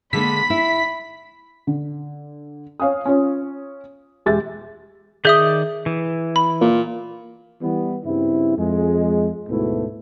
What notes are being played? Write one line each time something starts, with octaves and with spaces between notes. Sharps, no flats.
D3 G#3 A#3 B5 B6
E4
D3
C#5 F5 G#5 D#6
C#4 F4 C#5
E1 G#3 G4 E5 A6
D#3 G#4 D5 E5 D#6 G6
E3
B5
A#2
E3 G3 B3
G2 C#3 C4 E4
F2 G#3
D2 G#2 B2 A3 B3 E4